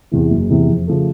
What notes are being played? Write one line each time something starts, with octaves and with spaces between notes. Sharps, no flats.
E2 C3 E3
F#1
E2 C3 E3
F2
C#3 F3 A3